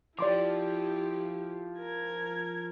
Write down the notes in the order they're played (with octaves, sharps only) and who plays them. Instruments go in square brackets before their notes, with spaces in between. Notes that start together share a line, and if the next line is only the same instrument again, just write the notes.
[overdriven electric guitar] F3 [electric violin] E4 G4 [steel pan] D5 C6 D6
[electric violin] A#4 G#6